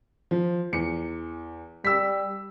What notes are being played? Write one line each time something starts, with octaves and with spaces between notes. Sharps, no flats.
F3
E2 C#7
G3 E6 B6